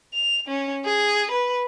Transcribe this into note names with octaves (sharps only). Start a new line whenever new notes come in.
F7
C#4
G#4
B4